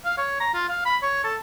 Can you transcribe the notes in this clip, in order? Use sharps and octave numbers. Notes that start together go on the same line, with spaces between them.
F5
C#5
A#5
F4
F5
B5
C#5
A4